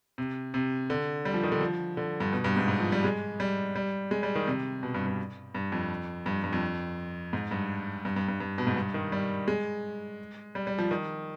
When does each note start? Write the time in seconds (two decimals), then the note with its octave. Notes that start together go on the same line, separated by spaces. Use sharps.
0.18 C3
0.54 C3
0.90 D3
1.25 G3
1.34 F3
1.43 D#3
1.52 D3
1.61 F3
1.97 D3
2.20 G2
2.32 B2
2.44 G2
2.56 G#2
2.68 G#2
2.80 F3
2.92 G3
3.04 G#3
3.40 G3
3.76 G3
4.11 G#3
4.23 G3
4.35 D#3
4.47 C3
4.83 B2
4.94 G2
5.07 G2
5.55 G2
5.72 F2
6.26 G2
6.44 G2
6.53 F2
7.33 G#2
7.51 G2
8.05 G2
8.16 G2
8.28 G2
8.40 G2
8.58 B2
8.67 G#2
8.76 G2
8.94 D#3
9.12 G3
9.48 G#3
10.55 G3
10.67 G3
10.78 F3
10.91 D#3